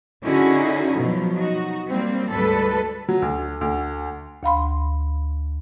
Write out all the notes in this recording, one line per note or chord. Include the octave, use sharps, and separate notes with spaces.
D3 C#4 D#4 E4 F#4 G#4
B2 F3 F#3
D#4 F#4
F#3 G3 A#3 C4
D2 G#2 G3 A4 B4
F#3
D2
D2
D2 F5 B5 C6